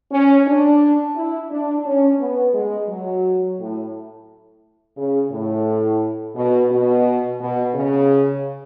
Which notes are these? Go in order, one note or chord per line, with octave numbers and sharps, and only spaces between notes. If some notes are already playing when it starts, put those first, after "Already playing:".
C#4
D4
E4
D4
C#4
B3
G#3
F#3
A2
C#3
A2
B2
B2
B2
C#3